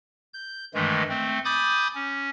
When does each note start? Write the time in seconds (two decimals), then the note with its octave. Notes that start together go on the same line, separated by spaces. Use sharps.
0.34 G6
0.74 G2 D#3 E3 G#3 A3
1.09 A3 C4
1.45 G#5 B5 D6 D#6 G6 A6
1.94 C#4